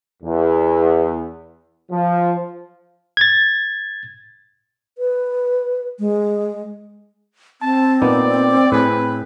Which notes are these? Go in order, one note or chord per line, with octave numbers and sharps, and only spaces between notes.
E2
F3
G#6 A6
B4
G#3
C4 A5
A#2 B3 D#4 D5
A2 G#4 B4